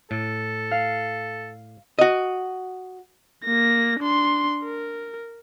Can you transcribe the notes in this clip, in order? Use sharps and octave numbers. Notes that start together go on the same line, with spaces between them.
A2 A4
F5
F#4 D#5
A#3 A#6
D4 C6
A#4